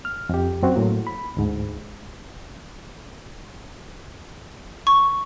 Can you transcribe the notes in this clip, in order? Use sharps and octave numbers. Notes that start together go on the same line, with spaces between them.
F6
F2 G4
F#2 C4 F#4
A2 F#3 A#3
B5
D2 G#2
C#6